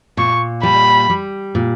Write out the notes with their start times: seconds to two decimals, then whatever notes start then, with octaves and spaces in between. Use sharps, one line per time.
0.17 A#2 C#6
0.63 G3 B5
1.10 G3
1.55 A#2